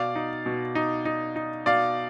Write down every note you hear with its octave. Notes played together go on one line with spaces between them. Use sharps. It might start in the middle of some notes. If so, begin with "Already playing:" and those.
Already playing: B2 D5 F5
D#4
B2
D#4
D#4
D#4
B2 D5 F5